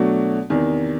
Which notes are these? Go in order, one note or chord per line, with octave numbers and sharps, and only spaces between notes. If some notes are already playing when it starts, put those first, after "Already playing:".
Already playing: B2 F#3 A3 D4 F#4
E2 C3 D#3